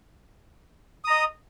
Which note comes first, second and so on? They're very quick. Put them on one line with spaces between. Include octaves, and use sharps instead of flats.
D#6 A#5 D#5